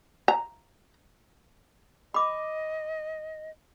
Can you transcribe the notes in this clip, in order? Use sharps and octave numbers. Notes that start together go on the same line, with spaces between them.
A#5
D#5 B5 D6